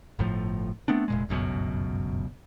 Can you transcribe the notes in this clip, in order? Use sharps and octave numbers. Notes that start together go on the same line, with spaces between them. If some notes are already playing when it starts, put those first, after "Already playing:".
G1 A2 F3
A3 B3 C4 D4
F1 A#2 G#3
G1 C#2 F#2 B2